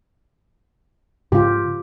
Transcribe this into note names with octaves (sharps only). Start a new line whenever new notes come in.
G#2 C#3 G#3 F4 G4